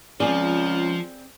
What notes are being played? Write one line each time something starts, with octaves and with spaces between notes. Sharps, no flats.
C#2 F3 C4 G#4 D5